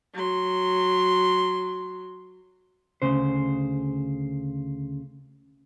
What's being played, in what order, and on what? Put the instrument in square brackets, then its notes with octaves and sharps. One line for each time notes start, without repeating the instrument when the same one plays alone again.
[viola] F#3 C6
[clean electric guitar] D2 C#3 C5